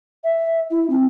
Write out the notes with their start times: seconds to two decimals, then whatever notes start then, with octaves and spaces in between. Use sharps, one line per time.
0.24 E5
0.71 E4
0.90 C4